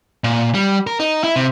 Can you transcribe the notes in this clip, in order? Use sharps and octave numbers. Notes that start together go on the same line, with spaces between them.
A#2
G3
A#4
D#4
E4
C3